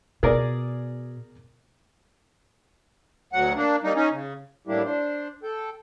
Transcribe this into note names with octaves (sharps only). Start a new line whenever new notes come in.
B2 G#4 A#4 D5
D2 F#3 F#5
A#3 D4
G3 A#3 D#4
C#4 D#4
C#3
A2 G3 A#3 D4 E4 G4
D4 C5
A4 G5